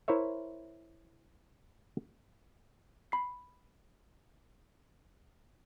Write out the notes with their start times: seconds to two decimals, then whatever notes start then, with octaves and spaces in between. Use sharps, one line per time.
0.08 E4 A#4 C5 C#5 E5
3.12 B5 C7